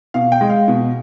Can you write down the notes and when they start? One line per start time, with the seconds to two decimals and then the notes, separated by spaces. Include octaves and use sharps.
0.14 B2 F5
0.32 G5
0.41 G#3
0.50 F5
0.68 B2